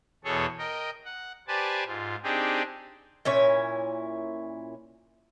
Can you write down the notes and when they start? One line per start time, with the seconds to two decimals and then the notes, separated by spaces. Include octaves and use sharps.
0.24 E2 B2 G#4 A4 C#5
0.58 A#4 D#5 G5
1.05 F#5
1.48 G4 B4 C5 D5 G#5 A5
1.86 G#2 F4
2.23 C4 D4 D#4 G4 G#4
3.25 A#2 C#4 E4 C#5